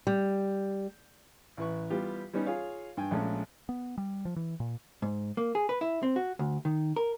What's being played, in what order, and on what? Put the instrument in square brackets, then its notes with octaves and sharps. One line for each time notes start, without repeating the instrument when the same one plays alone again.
[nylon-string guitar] G3
[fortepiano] A1 E4 B4 C#6
E3 G3 B3 F4 G4
G3 B3 C#4 D#4
F4 G#4 C#5 F5
G2 G5 G#5
A#1 G#3 A3 C#4 A4
[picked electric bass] B3
G3
F3
E3
A#2
[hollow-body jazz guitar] G#2
A#3
G#4
B4
E4
C4
F#4
D2
D#3
A#4